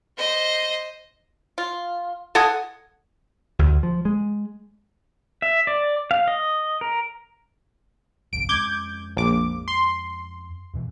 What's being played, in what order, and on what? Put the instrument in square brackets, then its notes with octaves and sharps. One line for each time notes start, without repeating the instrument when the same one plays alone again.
[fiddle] C5 D#5
[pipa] F4
A4 D#5 F#5 G#5
[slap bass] D2
F3
G#3
[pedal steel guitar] E5
D5
F5
D#5
A#4
[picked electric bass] G1 C2 F2 [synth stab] D7
[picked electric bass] F2 G#3 C#4 [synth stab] D6 G6 G#6
[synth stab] A#1 D6
C6
[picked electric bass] F2 B2 E3